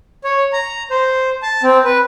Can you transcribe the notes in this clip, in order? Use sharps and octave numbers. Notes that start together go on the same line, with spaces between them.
C#5
A#5
C5
A5
C4
B4